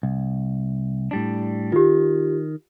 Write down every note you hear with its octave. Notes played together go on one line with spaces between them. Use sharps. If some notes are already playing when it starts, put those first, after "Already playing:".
C2
A2 G3 D4
D#3 F4 G4